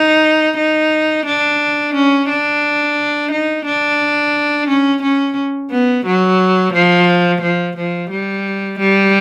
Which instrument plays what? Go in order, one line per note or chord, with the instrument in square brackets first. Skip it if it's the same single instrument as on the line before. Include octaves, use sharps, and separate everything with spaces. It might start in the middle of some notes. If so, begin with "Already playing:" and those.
Already playing: [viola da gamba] D#4
D#4
D4
C#4
D4
D#4
D4
C#4
C#4
B3
F#3
F3
F3
F3
G3
G3